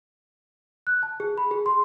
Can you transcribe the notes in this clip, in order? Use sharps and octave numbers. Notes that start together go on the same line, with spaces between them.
F#6
A5
G#4
B5
G#4
C6